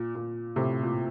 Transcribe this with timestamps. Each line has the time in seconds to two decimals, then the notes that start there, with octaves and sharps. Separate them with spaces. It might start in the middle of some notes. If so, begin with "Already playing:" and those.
Already playing: A#2
0.15 A#2
0.56 A2 C3
0.83 A#2